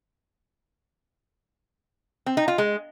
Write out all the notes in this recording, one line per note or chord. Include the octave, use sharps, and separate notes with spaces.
C4
D#4
F4
G#3